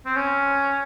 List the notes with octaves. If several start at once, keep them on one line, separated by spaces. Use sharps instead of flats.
C4
C#4